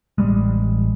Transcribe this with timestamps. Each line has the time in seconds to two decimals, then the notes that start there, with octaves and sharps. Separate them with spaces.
0.18 A1 G3 G#3